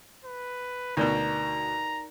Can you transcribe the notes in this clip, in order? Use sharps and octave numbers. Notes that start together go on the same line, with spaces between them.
B4
D2 B2 D#4 A#4 D5 A#5